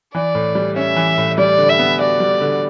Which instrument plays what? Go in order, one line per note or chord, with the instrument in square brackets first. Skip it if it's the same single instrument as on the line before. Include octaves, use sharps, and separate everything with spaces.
[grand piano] E3 [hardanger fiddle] D5
[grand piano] A2
G3
[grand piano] C#4 [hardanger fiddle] E5
[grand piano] E3
A2
[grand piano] G3 [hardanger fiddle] D5
[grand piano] D3
[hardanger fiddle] E5
[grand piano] B3
[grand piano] F#4 [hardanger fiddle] D5
[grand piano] G3
D3